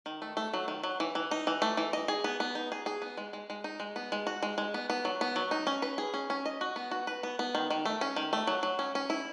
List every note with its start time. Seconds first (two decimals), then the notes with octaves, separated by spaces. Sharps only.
0.06 D#3
0.22 A3
0.37 A3
0.53 F#3
0.68 D#3
0.84 F#3
1.00 E3
1.15 E3
1.31 D#4
1.47 E3
1.62 A3
1.77 E3
1.93 D#5
2.08 G#4
2.24 B3
2.40 B3
2.55 D#4
2.72 G#4
2.86 G#4
3.02 B3
3.17 G#3
3.33 G#3
3.50 G#3
3.64 D#4
3.80 G#3
3.96 B3
4.12 G#3
4.27 F#4
4.43 G#3
4.58 G#3
4.74 B3
4.90 B3
5.05 F#3
5.21 B3
5.36 F#3
5.51 D#4
5.67 C#4
5.82 B4
5.98 G#4
6.14 C#4
6.30 C#4
6.46 D#5
6.61 F#4
6.76 B3
6.91 F#4
7.07 B4
7.23 B3
7.39 B3
7.55 D#3
7.70 D#3
7.85 A3
8.01 C#4
8.16 D#3
8.33 A3
8.47 F#3
8.63 F#3
8.79 C#4
8.95 C#4
9.10 E4